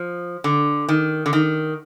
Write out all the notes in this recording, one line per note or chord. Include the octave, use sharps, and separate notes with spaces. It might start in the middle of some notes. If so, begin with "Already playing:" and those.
Already playing: F3
D3
D#3
D3
D#3